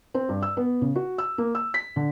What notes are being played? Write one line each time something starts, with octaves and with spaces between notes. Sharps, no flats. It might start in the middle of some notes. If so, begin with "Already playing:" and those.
C4
G2
E6
B3
C#3
F#4
E6
A#3
E6
B6
D3